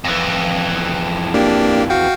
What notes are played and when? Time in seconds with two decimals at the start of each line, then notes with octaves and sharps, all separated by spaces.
0.05 F2 E3
1.34 A#3 D4 G4
1.90 F#4 F5 G5